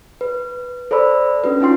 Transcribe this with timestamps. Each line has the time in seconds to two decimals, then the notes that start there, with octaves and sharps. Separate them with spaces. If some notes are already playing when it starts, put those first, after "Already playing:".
0.21 B4
0.91 A4 C5 D5 B5 E6
1.44 C#4 D4 F#4 B4
1.60 C#4 D#4 F4 G5 C6 C7